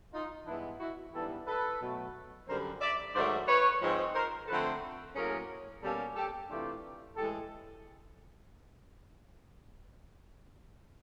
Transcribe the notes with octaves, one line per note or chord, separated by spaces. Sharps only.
D#4 F4
G2 E3 G#3 B3 D4 E4
E4 F#4
G#2 E3 G3 B3 D4 G4 A4
A4 B4
B2 F#3 A3
F#2 D3 G3 A#4 C5
D5 E5
G#2 D#3 F#3 A3 C5 D5
B4 C#5
G#2 F3 G#3 C4
A#4 C5
D3 F3 A3 C4 A4 B4
A2 F#3 A#3 C#4 G#4 A#4
B2 G3 A#3 C#4 G4 A4
G4 A4
C3 E3 A3 D4 F4 G4
A2 E3 G#3 G4 A4